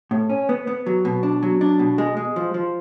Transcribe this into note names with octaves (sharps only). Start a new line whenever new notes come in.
A2
C#4
B3
B3
F#3
B2
D4
F#3
D4
B2
G#3
G#3
F3
F3